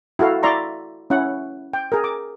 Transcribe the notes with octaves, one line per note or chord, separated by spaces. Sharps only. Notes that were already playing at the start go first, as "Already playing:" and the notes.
E4 F#4 A4 F5
E4 D5 E5 A#5 C6 C#6
C#4 E4 F#5
G5
G#4 A#4
D6